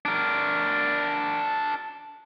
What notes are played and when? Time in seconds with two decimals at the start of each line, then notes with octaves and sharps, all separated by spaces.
0.05 D4 A#4